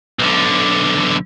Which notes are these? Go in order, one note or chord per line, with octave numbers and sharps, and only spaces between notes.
B1 D3